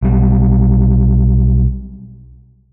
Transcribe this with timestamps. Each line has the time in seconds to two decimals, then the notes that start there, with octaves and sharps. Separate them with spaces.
0.03 B1 G3